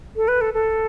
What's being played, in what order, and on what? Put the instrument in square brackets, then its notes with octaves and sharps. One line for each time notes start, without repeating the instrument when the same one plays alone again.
[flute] A4
B4
A4
A4